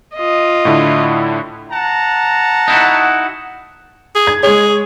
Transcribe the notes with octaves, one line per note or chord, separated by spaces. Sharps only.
F4 D#5
A2 D3 E4
F#5 A5 A#5
D#4 E4 F#4
G#4
G#6
G#3 G#4 C#5